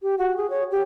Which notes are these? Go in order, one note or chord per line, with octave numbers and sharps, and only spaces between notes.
G4
F#4
G#4
C#5
G4